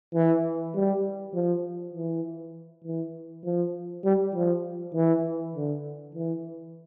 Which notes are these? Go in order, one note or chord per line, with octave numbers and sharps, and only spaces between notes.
E3
G3
F3
E3
E3
F3
G3
F3
E3
D3
E3